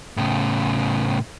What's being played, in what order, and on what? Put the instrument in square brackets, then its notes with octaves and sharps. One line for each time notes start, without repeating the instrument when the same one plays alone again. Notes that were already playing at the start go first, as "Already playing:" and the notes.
[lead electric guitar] A2 C#3